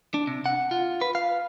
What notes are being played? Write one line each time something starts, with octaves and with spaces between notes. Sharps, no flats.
D4
C3
F#5
F4
B4
F5